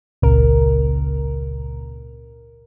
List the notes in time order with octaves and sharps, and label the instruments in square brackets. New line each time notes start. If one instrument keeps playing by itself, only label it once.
[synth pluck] G#1 C#2 A#2 C#3 A#4